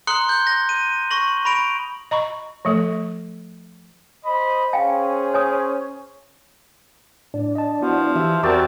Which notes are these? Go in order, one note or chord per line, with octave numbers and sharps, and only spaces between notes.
A#5 C6 D#6 F#6 C#7 G7
G6 G7
A#6
D#7
C#6 A#6 F#7
B5 A#6 D7 F7
D#5 A#5 B5 C#6
F3 A3 A4
C5 D#5 B5
C#4 G#4 C5 F5 G5 G#5
C#5 G#5 D#6
A2 D4
D#5 A5
F3 B3 E4 F#4
E3 G4 E5
E2 C4 F#4 G4 A#4 D5 A5